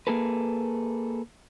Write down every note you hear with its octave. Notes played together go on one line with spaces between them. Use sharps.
A#3 G#4 A4 B4